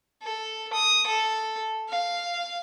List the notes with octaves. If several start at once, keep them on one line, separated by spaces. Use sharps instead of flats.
A4
D#6
A4
F5